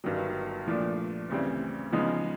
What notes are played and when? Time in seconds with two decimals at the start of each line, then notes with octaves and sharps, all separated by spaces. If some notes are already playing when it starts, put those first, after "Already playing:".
0.04 G1 G2 D#3 F#3
0.66 A#2 F3 A3 D4
1.30 D2 C#3 E3 G3 C4
1.92 C#3 F3 G#3 B3 D#4